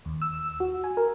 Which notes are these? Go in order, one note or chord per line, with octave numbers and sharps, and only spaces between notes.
D#2
E6
F#4
G#5
A#4